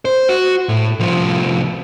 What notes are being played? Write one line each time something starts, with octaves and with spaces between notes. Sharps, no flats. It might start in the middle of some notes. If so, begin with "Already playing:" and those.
C5
F#4
A2
C2 F3